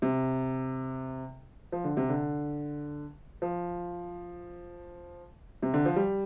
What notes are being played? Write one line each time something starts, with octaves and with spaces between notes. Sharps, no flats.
C3
F3
D3
C3
D3
F3
C3
D3
F3
G3